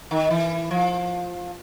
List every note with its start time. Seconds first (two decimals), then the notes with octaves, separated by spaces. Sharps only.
0.11 D#3
0.30 E3
0.71 F3